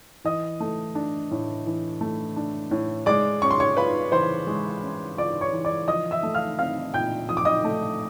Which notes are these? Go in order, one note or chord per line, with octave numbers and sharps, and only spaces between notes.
E3 D#5 D#6
A3
D4
A2
E3
A3
D4
A2
G#3 D5 D6
C#4 C#6
C6
C#5 C#6
F4 B4 B5
E3 C5 C6
G#3
C#4
F4 D5 D6
C#5 C#6
E3
D5 D6
F3 D#5 D#6
E5 E6
A3
F5 F6
C4 F5 F6
A#2 G5 G6
F3 D#6
D6
D#5 D#6
A3